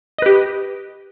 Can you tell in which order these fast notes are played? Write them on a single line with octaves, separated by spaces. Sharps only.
D#5 B4 G4